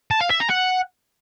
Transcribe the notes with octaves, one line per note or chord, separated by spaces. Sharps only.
A5
F5
E5
A#5
F#5